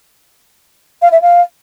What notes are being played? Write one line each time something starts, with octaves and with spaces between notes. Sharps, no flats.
F5
E5
F5